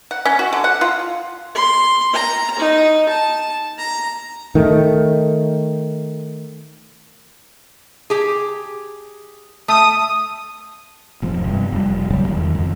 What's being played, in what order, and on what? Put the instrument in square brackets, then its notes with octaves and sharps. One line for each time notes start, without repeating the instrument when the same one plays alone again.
[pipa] F#5
C#4
F#4
D3
F#5
F4
[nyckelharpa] C6
A#5
D#4
A5
A#5
[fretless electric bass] D#3 A3
[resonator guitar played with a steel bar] G4 G#4
[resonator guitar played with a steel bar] A3 [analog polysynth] D#6
[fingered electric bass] E1 G#2 F3
G2 C3
F1 G3
E1 C#3 F#3 G3
E2 D#3
F2